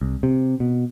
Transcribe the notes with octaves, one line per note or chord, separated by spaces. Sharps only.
C2
C3
B2